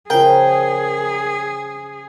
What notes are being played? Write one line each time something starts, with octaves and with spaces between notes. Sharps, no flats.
C#3 F3 G#4 A#4 G5